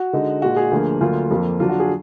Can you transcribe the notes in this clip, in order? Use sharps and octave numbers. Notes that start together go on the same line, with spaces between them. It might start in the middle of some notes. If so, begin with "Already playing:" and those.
Already playing: F#4
D3 G#3 D#4
A#2 G#3 D#4 F#4
G#4
D2 D3 F3 A#3
D2 D3 F#3 A#3 F4
F2 F3 A#3
D3 F#3 D4 F4
F#4
G#4